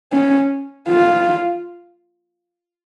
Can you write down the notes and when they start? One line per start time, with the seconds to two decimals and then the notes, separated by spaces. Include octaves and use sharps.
0.13 C#4
0.88 F4